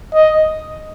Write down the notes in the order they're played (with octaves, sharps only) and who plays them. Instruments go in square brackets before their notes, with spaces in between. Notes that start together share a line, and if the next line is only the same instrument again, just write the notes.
[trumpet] D#5